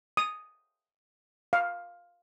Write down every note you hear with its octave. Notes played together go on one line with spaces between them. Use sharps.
D#6
F5